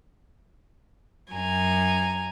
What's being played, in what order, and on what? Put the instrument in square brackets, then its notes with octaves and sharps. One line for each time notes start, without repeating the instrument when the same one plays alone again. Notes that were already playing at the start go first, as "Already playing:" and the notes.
[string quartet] F#2 G#5 A#5